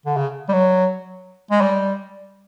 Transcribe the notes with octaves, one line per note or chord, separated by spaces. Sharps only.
D3
C#3
G3
F#3
G#3
G3